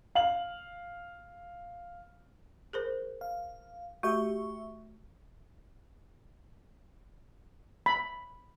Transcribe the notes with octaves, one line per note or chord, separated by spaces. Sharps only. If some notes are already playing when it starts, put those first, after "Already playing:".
F5 F#7
G#4 A#4 C5
F5
A3 F#4 G4 E5 C#6
B5